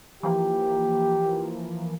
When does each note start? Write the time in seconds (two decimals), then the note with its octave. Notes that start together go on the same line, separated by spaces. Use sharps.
0.23 E3 F3 A#3 G4